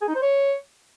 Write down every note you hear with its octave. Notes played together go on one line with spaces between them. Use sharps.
G#4
D#4
C5
C#5